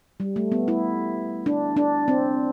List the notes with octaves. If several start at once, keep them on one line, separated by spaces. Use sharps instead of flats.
G3
A3
B3
E4
D4
D4
C4